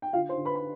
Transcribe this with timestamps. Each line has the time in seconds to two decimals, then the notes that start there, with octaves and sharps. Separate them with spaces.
0.02 G5
0.13 D3 F4 F5
0.29 C5 C6
0.37 D3
0.45 B4 B5
0.55 B5